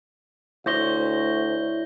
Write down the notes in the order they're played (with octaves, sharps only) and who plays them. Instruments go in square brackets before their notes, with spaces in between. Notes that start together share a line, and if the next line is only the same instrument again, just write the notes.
[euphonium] D2 [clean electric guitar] E4 C5 C#5 [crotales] G6 A#6 G7